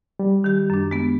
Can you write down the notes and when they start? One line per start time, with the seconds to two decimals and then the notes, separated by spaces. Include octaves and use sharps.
0.19 G3
0.44 D#3 G4
0.70 F#2 D4
0.91 G#3 B3